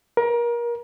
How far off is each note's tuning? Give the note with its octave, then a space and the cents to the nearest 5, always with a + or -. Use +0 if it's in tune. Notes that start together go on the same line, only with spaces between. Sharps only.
A#4 +30